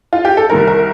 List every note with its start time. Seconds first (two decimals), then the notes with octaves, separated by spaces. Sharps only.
0.13 F4
0.25 G4
0.37 A4
0.50 C2 C3 D#3 G3 A#4
0.67 A#4